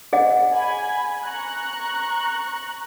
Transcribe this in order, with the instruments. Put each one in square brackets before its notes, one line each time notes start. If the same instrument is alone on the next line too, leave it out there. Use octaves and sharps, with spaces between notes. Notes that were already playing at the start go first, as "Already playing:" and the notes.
[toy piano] G#4 D#5 F#5
[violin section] G#5 B5 G#6
A#5 C#6 F#6